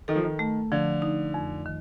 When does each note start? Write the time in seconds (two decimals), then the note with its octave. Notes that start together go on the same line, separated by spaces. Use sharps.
0.08 D#3 A4
0.16 F3
0.24 D#3
0.39 A3
0.72 D3 F3
1.02 D#4
1.34 F2
1.66 D#3